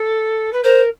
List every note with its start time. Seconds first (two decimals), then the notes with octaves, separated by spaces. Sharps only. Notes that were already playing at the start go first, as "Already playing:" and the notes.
Already playing: A4
0.53 B4
0.64 A#4 C5